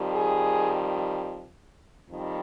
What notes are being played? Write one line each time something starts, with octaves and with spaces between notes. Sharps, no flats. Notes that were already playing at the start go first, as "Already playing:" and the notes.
Already playing: F2 D#3 G3
G#4
F2 D#3 G3